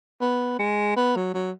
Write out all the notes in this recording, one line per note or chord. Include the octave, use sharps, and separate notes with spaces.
B3
G#3
B3
F#3
F#3